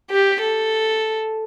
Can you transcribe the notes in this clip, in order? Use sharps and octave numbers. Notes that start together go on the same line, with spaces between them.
G4
A4